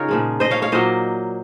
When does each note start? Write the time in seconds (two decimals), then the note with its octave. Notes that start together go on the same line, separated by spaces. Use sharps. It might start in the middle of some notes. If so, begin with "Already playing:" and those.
Already playing: C#3 D#4 F4 G#4 A#4 C#5
0.08 A#2 F3 G#3
0.40 C5 D#5
0.51 C#5 F5
0.62 C#5 F5
0.72 A#2 F#3 A#3 C5 D#5